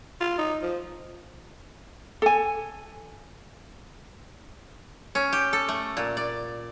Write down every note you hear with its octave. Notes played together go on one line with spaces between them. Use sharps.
F4
D#4
F3
A4 G#5
C#4
G4
A4
A3
A#2
D5